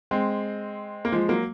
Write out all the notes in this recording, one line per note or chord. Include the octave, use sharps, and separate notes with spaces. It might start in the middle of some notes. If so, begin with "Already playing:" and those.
G#3 C4
A#3
F3 G#3
F#3 A#3